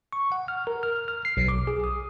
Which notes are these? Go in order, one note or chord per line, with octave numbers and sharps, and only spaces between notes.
C#6
F#5
F6
A#4
F6
F6
C7
B1
D6
G#4
D#6